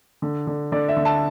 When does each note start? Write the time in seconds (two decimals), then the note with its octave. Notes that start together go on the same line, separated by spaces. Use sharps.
0.22 D3
0.47 D3
0.72 D3 D5
0.88 E5
0.97 D3
1.05 A5